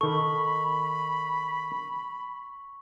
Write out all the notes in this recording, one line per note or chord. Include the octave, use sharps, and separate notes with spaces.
D#3 A4 B5 C#6